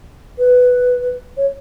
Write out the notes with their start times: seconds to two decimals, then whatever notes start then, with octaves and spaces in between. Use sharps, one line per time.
0.39 B4
1.37 C#5